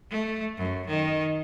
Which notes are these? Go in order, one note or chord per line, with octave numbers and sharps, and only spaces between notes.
A3
F#2
D#3